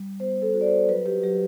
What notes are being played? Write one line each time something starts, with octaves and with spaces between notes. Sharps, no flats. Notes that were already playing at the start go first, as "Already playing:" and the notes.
Already playing: G3
B3 C5
A4
F#4
D5
C5
F#3 B4
G4
F#3 G4